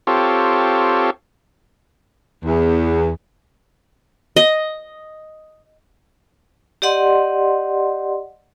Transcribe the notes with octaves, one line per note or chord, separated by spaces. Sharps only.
C4 F4 G4 A4 C#5
E2
D#5
G4 D5 D#5 F#5 C6